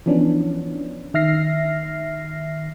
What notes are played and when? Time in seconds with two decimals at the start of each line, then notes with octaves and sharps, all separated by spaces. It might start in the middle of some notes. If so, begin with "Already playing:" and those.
0.06 E3 F3 B3 C#4 D4
1.14 D#3 E5 F6 A#6 C7